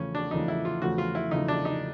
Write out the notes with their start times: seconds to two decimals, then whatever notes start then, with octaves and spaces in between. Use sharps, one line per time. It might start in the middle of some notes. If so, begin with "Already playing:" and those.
Already playing: E2 C#3 F3 A3 C#4
0.15 D4
0.31 E2 C#3 F3 A3 D#4
0.48 E4
0.65 F4
0.82 E2 C#3 F3 A3 F#4
0.98 F4
1.15 E4
1.31 E2 C#3 F3 A3 D#4
1.48 D4
1.65 D#4